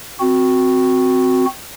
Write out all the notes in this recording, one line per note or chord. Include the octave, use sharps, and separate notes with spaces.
C4 F#4